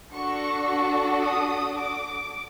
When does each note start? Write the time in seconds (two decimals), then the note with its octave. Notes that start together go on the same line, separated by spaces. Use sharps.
0.13 D4 F#4 A4 C#6
0.68 C#6
1.23 D#6
1.77 D6